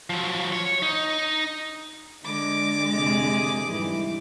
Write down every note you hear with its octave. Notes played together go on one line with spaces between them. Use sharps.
F3 F#3
C#5
D#4
D3 G#3 D6
F2 C3 G#4
G#2 E3 G3